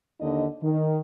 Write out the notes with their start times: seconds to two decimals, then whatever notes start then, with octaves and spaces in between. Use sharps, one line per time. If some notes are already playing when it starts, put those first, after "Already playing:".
0.20 D#2 D3 D#4 D#5
0.62 D#3